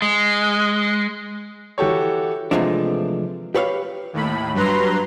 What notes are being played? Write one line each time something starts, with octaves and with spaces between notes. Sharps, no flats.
G#3
E3 F#4 G4 A4 C#5
C3 E3 F3 G#3 A3 D4
G4 B4 C#5 E5 F5
D#2 A2 B5
G2 F#3 B4 A#5 C6